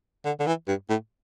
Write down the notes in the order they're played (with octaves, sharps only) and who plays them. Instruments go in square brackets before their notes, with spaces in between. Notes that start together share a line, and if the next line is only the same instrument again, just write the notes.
[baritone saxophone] D3
D3
E3
G2
A2